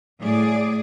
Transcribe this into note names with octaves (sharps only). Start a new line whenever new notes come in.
A2 G#4 D5